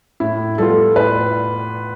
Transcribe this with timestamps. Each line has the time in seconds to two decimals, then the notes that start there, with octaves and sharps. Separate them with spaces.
0.20 A2 E4
0.58 G3 B3 F4 A4
0.96 A2 B4